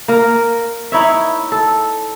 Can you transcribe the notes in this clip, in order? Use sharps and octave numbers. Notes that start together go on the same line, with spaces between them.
A#3 A#4
D#4 E4 C#5 E5
A4